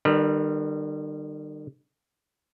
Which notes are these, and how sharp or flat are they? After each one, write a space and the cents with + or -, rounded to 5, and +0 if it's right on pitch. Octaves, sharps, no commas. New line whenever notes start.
D#3 -45 G3 +0 B4 -35